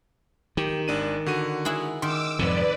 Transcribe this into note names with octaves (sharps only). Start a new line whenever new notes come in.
D#3 G4
G#1 D4 D#7
D3 F#4 D#7
E4 G#4 F#5
D#3 C6 D6 E6
F2 G#2 C3 B4 D5